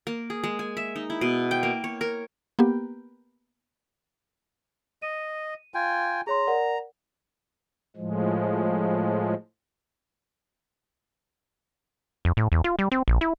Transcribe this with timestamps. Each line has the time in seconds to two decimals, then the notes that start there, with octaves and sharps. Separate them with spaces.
0.07 A#3
0.30 G#4
0.44 G#3
0.59 G#5
0.77 E5
0.96 D#4
1.10 E4
1.21 B2
1.51 G5
1.63 A#3
1.84 C#5
2.01 A#4
2.59 A#3 B3 G4
5.02 D#5 D#7
5.74 F4 G5 G#5
6.27 G#4 C#5 A#5 C6
6.47 A#4 D5 F#5
7.96 A2 F3 G#3
12.25 F2
12.37 A2
12.52 E2
12.64 F4
12.79 G3
12.92 C4
13.08 A#1
13.21 E4